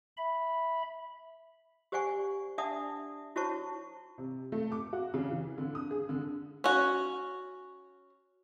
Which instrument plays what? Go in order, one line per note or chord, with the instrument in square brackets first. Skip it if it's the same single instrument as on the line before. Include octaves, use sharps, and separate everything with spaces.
[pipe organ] E5 B5
[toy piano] G4 C5 D5 F#5 G#5 C#6
D4 D5 E5 F#5 A5 D#6
E4 F#4 C5 C#5 A5 C#6
[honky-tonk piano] C3
A3
D6
F#4
C#3
E3
D3
D#6
G#4
D3
[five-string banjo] C#4 F#4